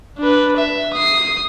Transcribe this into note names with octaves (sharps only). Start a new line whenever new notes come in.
D4 B4
E5
D#6 C7